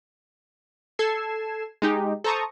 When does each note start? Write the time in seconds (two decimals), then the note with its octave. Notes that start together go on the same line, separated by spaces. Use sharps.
0.99 A4 G#6 C7 E7
1.82 G#3 D#4 G4
2.24 A4 C5 A#5 C#6 D#6